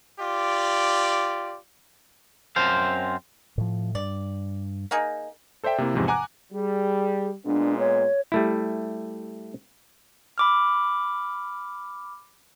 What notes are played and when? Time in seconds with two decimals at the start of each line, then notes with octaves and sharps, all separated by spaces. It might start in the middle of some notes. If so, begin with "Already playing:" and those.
0.20 F4 G4 D5
2.56 F#2 C4 C5 F5
3.58 A2 F3
3.95 G2 D5
4.91 A#3 D#4 G#4
5.64 A4 C5 D5 E5 G5
5.78 C3 A#3 E4
5.94 E2 G#2 C3 F3
6.07 F#5 G#5 A#5 D6 F#6
6.53 G3 G#4
7.45 A#2 G#3 B3 D4
7.78 C#5
8.32 G3 A3 E4
10.38 B5 D6 F6